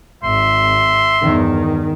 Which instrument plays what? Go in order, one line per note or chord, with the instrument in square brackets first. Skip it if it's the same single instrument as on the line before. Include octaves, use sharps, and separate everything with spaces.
[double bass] G#1 [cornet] E5 [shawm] C6
[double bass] E2 G2 [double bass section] D#3